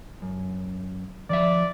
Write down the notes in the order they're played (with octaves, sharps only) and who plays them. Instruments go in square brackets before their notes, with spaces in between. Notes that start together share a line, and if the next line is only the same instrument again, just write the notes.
[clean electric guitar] F#2
[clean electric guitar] D#3 F3 E5 [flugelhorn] D5